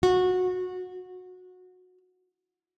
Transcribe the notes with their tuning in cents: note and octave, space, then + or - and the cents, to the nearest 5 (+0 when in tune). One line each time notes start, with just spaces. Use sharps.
F#4 -20